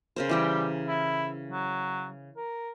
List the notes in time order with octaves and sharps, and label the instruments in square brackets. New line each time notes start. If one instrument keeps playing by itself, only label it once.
[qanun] C#3 A#4 C5
[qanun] E3 G4 G5 [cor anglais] G3
[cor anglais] E4
F#3
A#4